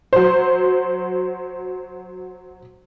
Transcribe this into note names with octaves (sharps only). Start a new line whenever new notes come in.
F#3 C5